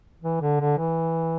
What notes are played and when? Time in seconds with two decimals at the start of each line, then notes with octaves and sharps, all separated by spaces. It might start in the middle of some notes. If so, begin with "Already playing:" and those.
0.22 E3
0.41 D3
0.61 D3
0.78 E3